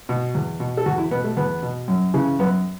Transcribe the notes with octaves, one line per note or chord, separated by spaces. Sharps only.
B2
E2
B2
A4
E2 F#4
E4
B2 B3
A3
E2 B3
B2
F#2
C#3 E3
F#2 B3